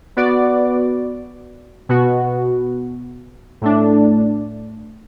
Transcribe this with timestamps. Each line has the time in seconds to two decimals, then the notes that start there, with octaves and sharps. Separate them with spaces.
0.17 B3 F#4 D5
1.89 B2 B3 F#4
3.61 A2 A3 D4